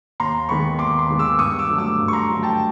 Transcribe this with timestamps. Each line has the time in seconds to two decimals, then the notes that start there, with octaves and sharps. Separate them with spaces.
0.20 D#2 A#5 C6
0.49 D#3 G#3 B3 B5 C#6
0.79 D#2 C6 D6
0.99 C6 D6
1.09 D#3 G#3 B3
1.19 D6 E6
1.39 G2 C#6 D#6
1.59 D6 E6
1.69 D3 F#3 A3
1.78 D6 E6
1.99 G2
2.08 C#6
2.13 A#5 C6
2.28 D3 F#3 A3
2.43 G5 A5